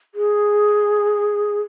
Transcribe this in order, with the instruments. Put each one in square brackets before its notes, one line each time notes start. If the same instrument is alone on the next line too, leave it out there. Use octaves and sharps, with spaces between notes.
[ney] G#4